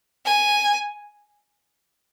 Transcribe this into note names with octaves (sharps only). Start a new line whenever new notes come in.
G#5